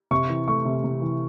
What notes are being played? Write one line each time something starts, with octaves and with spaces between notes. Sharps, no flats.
C3 C#6
E3
A3 C#6
C3
C3
E3